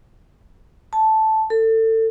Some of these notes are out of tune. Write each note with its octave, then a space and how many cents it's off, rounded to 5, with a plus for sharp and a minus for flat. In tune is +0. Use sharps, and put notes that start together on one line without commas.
A5 -5
A4 +25